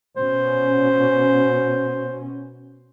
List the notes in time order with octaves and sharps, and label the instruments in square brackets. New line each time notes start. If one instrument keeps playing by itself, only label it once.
[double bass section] B2 C#4 [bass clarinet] C5